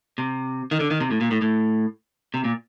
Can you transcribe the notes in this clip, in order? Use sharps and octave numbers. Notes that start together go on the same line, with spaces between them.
C3
D#3
D3
D#3
C3
A2
A#2
A2
A2
C3
A#2